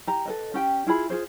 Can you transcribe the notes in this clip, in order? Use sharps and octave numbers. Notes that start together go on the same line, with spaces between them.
G4 A#5
A4 B4 D#5
C#4 G4 G5
E4 F4 G#4 B5
F4 F#4 G#4 C5